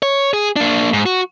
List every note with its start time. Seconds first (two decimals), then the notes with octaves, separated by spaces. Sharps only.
0.03 C#5
0.33 G#4
0.56 A#3 D4
0.93 G#2
1.06 F#4